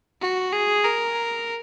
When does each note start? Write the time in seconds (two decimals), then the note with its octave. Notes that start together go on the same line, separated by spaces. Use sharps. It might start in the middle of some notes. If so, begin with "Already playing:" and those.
0.21 F#4
0.53 G#4
0.85 A#4